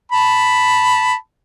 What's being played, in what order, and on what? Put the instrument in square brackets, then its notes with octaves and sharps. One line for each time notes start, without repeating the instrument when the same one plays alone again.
[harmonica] A5 B5